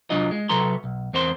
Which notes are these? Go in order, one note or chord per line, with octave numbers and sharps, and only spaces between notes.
C2 F#3 D4 F4 D#5
G#3
C3 F#3 A4 B4 A#5 C6
B1
E2 C4 A#4 C5 C6